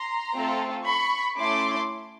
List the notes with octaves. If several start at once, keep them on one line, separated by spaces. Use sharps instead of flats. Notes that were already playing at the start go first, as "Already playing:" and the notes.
Already playing: A#5 C6
A3 C4 F4 A4
B5 C#6
A3 C#4 E4 C6 D6